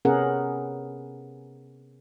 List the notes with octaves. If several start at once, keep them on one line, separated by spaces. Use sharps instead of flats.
C3 B3 C#4 G#4 A#4 F#5